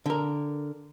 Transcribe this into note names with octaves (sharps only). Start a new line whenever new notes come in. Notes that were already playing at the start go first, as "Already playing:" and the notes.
D3 A#4